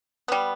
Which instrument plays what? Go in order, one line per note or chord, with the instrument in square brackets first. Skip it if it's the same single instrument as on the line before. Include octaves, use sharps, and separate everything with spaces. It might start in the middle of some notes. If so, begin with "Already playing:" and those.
[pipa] G3 B3